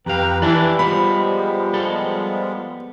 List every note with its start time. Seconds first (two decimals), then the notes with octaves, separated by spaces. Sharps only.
0.06 F2 G4 B4 F5 G5 A#5
0.42 E3 E4 B4 D5 G#5 A5
0.79 F3 G3 G#3 B3 F4 B4 B5
1.74 B3 A4